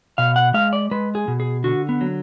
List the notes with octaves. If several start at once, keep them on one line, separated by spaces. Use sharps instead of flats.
B2 F5
F#5
G#3 F5
D5
G#3 B4
G#4
B2
G#4
D3 F#4
B3
F#3